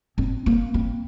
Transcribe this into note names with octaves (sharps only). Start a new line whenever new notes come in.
C4
A#3
C4